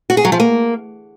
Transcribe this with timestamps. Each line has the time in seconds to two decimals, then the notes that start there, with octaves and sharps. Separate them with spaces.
0.10 F#4
0.17 G#4
0.25 F#3
0.32 F3
0.40 A#3